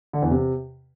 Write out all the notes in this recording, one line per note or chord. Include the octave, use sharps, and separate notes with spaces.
D3
E2
C3